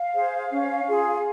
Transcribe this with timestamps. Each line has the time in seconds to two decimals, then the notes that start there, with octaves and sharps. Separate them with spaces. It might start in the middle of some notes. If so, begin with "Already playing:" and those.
Already playing: F5
0.14 G#4 C5
0.51 C#4
0.88 F4 G#4